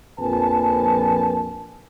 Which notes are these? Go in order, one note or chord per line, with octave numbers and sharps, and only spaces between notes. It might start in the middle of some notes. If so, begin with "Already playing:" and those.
A#1 F2 A#4 B4 G#5 A5